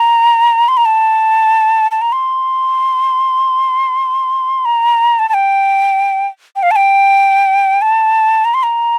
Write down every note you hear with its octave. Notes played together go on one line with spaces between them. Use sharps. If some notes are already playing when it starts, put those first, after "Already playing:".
Already playing: A#5
C6
A#5
A5
A5
A#5
C6
A#5
A5
A5
G5
G5
F5
A5
G5
A5
A#5
C6
A#5